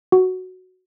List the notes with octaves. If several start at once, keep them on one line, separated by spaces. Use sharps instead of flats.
F#4